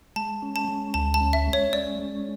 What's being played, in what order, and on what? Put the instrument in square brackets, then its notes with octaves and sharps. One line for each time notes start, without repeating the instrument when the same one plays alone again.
[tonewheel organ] G#3 [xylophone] A5
[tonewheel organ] C#4
[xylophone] A5
[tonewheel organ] G#3
[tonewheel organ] D2 [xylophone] A5
[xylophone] A5
[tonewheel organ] C#4
[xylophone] E5
[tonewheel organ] G#3
[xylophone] C#5
[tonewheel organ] C#4 [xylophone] D5
[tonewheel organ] G#3